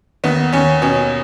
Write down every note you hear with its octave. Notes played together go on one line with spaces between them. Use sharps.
D#2 B3
D#2 C#4
B2 C#4